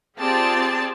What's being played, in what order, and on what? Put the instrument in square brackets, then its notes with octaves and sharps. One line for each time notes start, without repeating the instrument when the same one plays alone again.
[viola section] C4 F4 G4 G#4 D5 A5